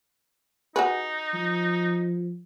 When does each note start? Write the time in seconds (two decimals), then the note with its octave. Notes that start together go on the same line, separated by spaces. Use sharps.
0.76 D#4 F#4 G#4 B4
1.34 F3